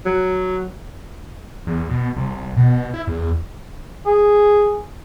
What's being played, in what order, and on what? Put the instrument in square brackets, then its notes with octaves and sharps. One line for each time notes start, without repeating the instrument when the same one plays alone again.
[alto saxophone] F#3
[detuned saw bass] E2
B2
C2
B2
E4
E2
[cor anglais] G#4